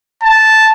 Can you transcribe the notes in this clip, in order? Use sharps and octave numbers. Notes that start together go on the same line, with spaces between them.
A5